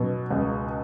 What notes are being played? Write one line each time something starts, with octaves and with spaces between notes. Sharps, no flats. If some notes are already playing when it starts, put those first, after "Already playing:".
Already playing: B2 F#3
C#2